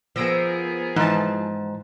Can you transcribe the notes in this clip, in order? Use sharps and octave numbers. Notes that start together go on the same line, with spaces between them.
F3 B3 G#4 A#4 E6 A#6 D7
G#2 E3 A5